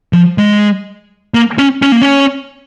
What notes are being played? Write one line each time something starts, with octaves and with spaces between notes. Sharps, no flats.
F3
G#3
A#3
C#4
C#4
A#3
C#4